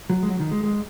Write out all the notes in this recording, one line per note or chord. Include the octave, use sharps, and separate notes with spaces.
F#3
G#3
F#3
D#3
G#3
G#3